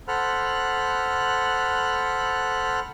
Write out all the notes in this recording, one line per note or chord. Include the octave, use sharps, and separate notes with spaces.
A4 C5 F#5 B5 F6 F#6